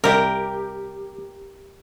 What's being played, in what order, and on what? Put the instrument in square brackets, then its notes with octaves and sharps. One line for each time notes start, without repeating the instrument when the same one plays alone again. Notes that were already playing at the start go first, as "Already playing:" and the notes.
[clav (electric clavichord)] C2 [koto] G4 A#4